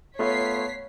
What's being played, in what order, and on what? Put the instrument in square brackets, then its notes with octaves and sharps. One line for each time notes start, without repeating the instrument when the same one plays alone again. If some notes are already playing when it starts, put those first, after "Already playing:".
[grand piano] A3 B3 F4 [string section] C#5 B6 C7